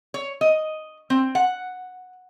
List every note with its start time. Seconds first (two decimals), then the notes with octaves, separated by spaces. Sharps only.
0.14 C#5
0.41 D#5
1.10 C4
1.35 F#5